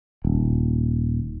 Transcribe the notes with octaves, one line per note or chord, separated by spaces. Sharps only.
D#1